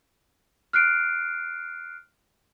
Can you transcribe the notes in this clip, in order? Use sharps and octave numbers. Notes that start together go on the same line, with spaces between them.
F6 F#6 C7 D7